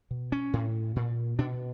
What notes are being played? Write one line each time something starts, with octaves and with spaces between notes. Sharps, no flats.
B2
C#4
A2
A#2
B2 D4